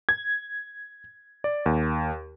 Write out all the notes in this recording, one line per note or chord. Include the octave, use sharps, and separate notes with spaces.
G#6
D5
D#2